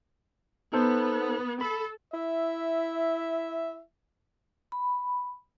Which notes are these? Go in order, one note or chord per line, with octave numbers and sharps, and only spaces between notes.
B3 D#4 A4 C5
A4 B5
E4 E5
B5